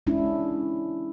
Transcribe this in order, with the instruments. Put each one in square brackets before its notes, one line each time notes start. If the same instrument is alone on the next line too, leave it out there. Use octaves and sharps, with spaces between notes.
[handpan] G#3 C#4 D4 E4